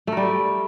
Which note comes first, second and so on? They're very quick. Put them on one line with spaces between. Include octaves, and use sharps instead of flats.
A3 A#4 G3